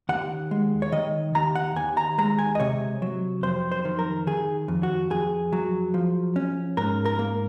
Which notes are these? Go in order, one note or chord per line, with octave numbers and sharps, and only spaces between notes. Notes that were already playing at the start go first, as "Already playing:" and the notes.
D#2 F#5
G#3
C#5
D#3 D#5
D#2 A#5
F#5
D#2 G#5
A#5
G#3 A#5
G#5
D#5
C3 C#5
F#3
F2 C5
C5
D#3
A#4
D#3 G#4
F2
F#4
F2 G#4
F#3
F3
C#4
G#2 A#4
A#4
A#3